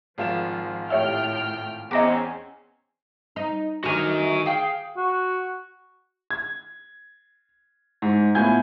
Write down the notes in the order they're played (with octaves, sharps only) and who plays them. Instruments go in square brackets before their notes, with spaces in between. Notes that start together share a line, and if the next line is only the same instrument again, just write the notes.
[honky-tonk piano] G#1 F4 E7 [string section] F3
[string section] A2 G5 F6 [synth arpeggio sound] G4 C#5 E5
[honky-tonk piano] E2 [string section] C4 C#4 [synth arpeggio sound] D#5 A#5 D6
[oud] D#4
[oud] D2 D#3 [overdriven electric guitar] F#4 G#5 [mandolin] C#6 F6
[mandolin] G#4 G5 [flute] F5
[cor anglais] F#4
[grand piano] G#6
G#2
A2 B3 F4 G#5 G6 G#6